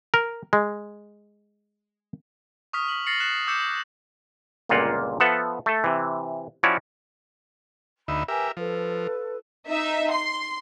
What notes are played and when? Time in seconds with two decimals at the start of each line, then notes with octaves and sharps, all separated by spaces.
0.14 A#4
0.53 G#3
2.73 C#6 D#6 F6 B6
2.88 B6 F#7
3.06 F6 A6 A#6 C7 C#7 F#7
3.20 F#6 B6 C7 E7
3.47 D6 E6 G6 C#7 E7
4.69 G1 C#2 A#2 A#3 F4 F#5
5.20 F3 B3 A4 E5 F#5
5.66 A3 A4
5.84 C3 E3
6.63 F3 C#4 E4 F#4 C#5 D5
8.08 D2 D#4 E5 B5
8.28 G4 A#4 B4 E5 G#5
8.57 F3 F4 A4 B4
9.68 D#4 E5
10.11 C6